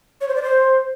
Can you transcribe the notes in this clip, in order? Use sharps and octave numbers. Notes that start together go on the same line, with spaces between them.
C#5
C5
D5
C5